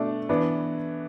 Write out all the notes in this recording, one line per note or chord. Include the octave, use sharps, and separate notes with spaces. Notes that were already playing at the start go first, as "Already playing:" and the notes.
Already playing: B2 A3 D4
E3 B3 D4